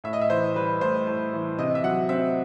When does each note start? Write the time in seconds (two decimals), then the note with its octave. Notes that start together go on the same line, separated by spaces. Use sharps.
0.04 A2 E5
0.13 D#5
0.21 E5
0.30 E3 C5
0.55 G3 B4
0.81 A2 C5
1.07 A2
1.33 E3
1.59 C3 D#5
1.75 E5
1.84 F#3 F#5
2.09 C4 E5